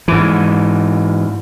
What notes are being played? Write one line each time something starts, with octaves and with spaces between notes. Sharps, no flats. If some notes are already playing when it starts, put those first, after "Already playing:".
G#2 E3